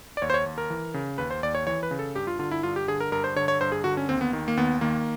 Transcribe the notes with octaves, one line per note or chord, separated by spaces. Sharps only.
D5
D#2 C#5
C5
C#5
D#2
A#4
E3
C#3
D#2 B4
C5
D#2 D5
C#5
E3 C#5
B4
C#3
A4
G2 G4
F4
D3 F4
E4
G2 F4
G4
D3 G#4
A#4
G2 A#4
C5
D3 C#5
C#5
G2 C5
G#4
D3 F#4
C#4
D#2 C4
B3
D#3
A#3
D#2 B3
D#3 A#3